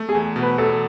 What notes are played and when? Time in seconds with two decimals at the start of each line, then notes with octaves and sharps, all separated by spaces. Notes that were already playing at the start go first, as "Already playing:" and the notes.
Already playing: A3
0.09 G#4
0.15 E2
0.36 B2
0.42 B4
0.58 E2 A4